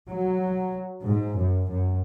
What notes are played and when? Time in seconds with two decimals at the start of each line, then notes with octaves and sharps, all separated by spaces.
0.11 F#3
1.04 G#2
1.35 F#2
1.66 F#2